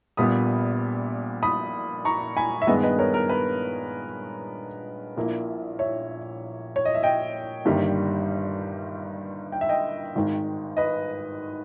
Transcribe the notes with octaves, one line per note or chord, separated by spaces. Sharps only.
A#1 A#2 G3 B3 B5 D#6
B5 D#6
A#5 C#6
G#5 B5
E5
G2 D#3 G#3 B3 B4 D#5
B4 D#5
A#4 C#5
A#4
B4
A#1 A#2 A#3 E4
C#5 E5
C#5
D#5
E5
D#5 G5
G1 G2 D#3 G3 A#3
G5
E5
D#5 G5
G#1 G#2 D#3
B4 D#5